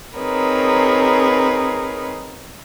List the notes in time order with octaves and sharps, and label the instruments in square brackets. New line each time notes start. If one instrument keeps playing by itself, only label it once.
[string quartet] C4 D#4 G#4 A#4 B4 C#5